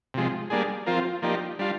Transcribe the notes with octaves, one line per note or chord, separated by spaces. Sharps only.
C3 F3 G#3
G3 A#3 D4 G#4
F3 C4 F4 A#4
F3 A#3 D#4 G4 D5
G3 D4 F4